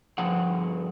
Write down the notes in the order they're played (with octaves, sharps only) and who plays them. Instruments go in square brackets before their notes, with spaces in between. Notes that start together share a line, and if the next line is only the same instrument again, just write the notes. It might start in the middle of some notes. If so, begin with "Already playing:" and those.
[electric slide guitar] G2 F3 G#4 F#5